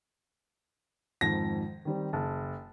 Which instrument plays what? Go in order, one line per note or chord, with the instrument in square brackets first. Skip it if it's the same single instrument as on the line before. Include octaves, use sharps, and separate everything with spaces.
[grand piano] F2 G#2 D#3 [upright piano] A#6
[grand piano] D#3 G3 C4
[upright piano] F#1 [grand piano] A5